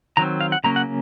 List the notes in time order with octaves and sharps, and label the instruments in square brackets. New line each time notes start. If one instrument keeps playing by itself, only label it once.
[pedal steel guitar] D#3 F#3 C4 A#5
F5
F#5
C#3 F#3 A#3 C#4 A#5
F#5